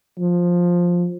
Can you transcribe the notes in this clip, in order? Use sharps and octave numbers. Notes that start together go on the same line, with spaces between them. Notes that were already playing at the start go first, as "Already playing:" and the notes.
F3